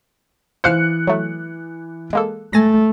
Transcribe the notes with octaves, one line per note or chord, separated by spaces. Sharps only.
E3 C5 F5 F6 F#6 C#7
F#3 A3
G#3 A#3 A4
A3 G#5 A6 A#6